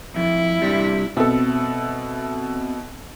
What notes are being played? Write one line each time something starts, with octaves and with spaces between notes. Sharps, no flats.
F2 E4
G2 C3 G3
B2 C4 A4 E5